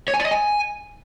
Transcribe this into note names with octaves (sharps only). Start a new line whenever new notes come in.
C#5
G#5
D5
D#5
G#5